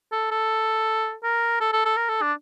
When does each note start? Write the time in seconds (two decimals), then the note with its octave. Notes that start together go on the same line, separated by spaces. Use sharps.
0.12 A4
0.31 A4
1.23 A#4
1.61 A4
1.73 A4
1.85 A4
1.97 A#4
2.09 A4
2.22 D4